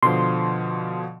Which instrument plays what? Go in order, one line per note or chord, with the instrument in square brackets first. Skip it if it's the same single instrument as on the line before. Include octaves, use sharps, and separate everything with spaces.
[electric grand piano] B2 D3 F3 [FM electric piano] C6